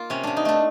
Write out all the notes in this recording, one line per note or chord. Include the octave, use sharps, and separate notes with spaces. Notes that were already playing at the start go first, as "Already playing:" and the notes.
Already playing: A#3 F4
C3 C#4
C3 D4
D#4
A3 D4